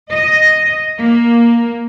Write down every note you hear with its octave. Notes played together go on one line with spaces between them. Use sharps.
D#5
A#3